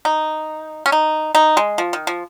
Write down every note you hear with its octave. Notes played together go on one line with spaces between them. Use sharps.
D#4
C#4
D#4
D#4
G#3
F3
D#3
F3